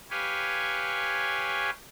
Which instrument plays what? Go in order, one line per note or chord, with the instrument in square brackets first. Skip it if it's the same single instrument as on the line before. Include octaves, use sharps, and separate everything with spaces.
[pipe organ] G4 B4 C#5 F5 G#5